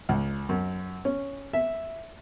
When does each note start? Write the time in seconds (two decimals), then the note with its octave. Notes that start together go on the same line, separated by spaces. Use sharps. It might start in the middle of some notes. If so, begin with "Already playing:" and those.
0.09 C#2
0.49 F#2
1.05 C#4
1.53 E5